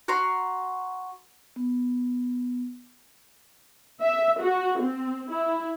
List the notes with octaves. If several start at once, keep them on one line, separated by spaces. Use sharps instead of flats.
F#4 A#5 C6
B3
E5
F#4
C4
E4